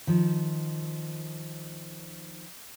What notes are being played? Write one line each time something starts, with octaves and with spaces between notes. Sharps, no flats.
D#3 F3